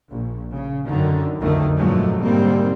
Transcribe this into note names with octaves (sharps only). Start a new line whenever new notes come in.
A#1
C#3
F#2 D3 D#3
B1 F2 D3 D#3 A3
G2 A#2 F3 F#3 G#3 A3
G#2 B2 D3 G3 A#3 C4